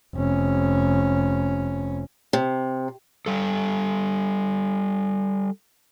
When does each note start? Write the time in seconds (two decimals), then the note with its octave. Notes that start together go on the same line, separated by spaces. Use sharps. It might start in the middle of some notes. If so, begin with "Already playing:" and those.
0.14 F1 C#4
2.33 C3
3.26 G3 A4